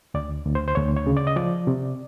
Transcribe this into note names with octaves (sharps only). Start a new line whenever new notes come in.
D2 D5
D2
C5
C5
D2 C#5
C#5
C#3
D5
D#5
F3 D5
C3